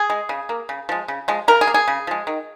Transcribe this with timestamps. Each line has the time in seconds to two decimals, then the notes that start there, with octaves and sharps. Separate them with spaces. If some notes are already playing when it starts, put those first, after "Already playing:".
Already playing: G#4
0.10 G#3
0.29 C#3
0.49 A#3
0.69 C#3
0.89 F3 G#3
1.08 C#3
1.28 F3 G#3
1.48 C#3 A#4
1.61 G#4
1.67 A#3
1.74 G#4
1.88 C#3
2.07 F3 G#3
2.27 D#3